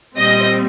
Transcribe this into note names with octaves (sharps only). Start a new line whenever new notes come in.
A#2 G3 C4 D#5